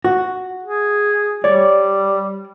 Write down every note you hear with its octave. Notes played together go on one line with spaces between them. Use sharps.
F#4
G#4
G3 C#5 D5